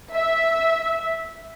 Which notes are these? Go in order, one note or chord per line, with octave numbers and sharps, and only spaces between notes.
E5